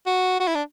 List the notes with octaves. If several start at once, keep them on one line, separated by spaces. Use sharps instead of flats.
F#4
F#4
E4
D4